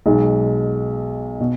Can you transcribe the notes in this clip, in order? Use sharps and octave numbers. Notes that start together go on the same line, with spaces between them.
B1 B2 G#3
B2